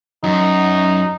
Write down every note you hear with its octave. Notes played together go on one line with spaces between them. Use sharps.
F#2 D#4